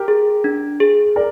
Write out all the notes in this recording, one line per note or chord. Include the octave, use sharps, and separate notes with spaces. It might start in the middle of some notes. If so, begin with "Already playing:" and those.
Already playing: G4 A#4
G#4
D4
G#4
A#4 D5